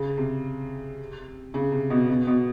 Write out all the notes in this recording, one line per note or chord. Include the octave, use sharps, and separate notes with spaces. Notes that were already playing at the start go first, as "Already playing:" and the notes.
Already playing: C#3
C3
C#3
C3
B2
B2
B2